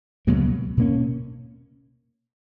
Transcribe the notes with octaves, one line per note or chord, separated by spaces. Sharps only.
C#2 B2 F#3 A#3
B2 A#3 C#4